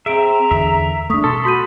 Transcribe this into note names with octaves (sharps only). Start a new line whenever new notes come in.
C4 G#4 E5 A#5 D7
E2 D3 E5
A3 D4 C#6 D#6 B6
B2 A4 C6
F#4 B5 C6 G6 D#7